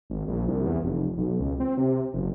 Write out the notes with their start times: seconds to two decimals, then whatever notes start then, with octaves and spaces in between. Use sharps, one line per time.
0.10 G#1
0.28 A#1
0.48 C2
0.66 E2
0.83 F1
1.17 B1
1.39 C#2
1.60 C4
1.78 C3
2.14 F#1